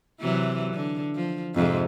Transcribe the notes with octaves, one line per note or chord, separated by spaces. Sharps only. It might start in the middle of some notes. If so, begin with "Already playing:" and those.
C3 E3 F#3
D3
F3
F2 G#2 C3